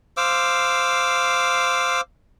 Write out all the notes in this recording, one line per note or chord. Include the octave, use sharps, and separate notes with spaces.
C5 F5 D6 E6